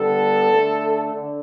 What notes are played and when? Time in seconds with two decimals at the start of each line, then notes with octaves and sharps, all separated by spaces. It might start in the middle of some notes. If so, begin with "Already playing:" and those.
Already playing: D3 G3 B3 A4
0.50 D3 A3
1.12 D3